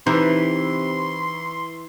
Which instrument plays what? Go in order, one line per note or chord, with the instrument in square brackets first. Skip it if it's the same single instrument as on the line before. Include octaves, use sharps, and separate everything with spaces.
[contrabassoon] C3 [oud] E3 [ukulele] D#4 [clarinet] C6